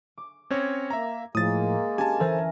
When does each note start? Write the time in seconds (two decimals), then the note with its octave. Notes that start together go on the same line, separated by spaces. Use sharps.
0.18 D6
0.50 C4 C#4 C#5 G#6 A#6
0.91 A#3 E5 A#5
1.35 A2 F3 G#3 A#3 D#6 A6
1.98 C#4 G4 G#5 A5
2.20 E3 A4 A#4 C5 A6